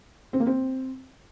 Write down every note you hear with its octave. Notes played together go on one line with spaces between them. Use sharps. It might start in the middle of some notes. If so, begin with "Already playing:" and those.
C4
A#3
C4